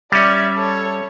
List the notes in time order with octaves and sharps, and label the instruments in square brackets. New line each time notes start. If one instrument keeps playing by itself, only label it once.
[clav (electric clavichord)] G3 C#4 [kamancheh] D5 E5
[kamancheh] A4 C#5